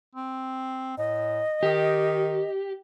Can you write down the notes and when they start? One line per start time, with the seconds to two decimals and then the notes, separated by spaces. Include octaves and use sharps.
0.15 C4
0.98 A2 D#5
1.63 D#3 G4